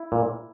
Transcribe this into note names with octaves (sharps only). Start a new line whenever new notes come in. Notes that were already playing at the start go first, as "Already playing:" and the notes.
Already playing: E4
A#2